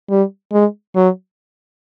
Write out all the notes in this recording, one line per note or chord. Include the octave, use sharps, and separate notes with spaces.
G3
G#3
F#3